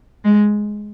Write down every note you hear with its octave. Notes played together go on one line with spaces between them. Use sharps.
G#3